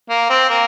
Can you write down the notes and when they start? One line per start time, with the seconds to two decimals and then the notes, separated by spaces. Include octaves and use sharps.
0.09 A#3
0.29 C4
0.49 A#3